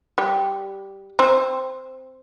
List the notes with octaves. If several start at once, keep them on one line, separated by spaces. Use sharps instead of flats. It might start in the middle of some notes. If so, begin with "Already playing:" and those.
G3 G4
C4 C5